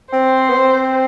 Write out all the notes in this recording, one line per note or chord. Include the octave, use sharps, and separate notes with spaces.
C4 C5
B3
C4